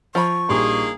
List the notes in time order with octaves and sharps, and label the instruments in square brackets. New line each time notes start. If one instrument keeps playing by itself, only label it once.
[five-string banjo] F3 A#5 B5 [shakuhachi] C#6
[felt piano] A#1 G3 C6 [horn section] A#3 D#4 G#4